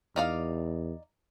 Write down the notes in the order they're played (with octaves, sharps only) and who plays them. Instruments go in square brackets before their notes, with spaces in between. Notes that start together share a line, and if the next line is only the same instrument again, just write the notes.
[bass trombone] E2 [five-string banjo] D#4 D5 F5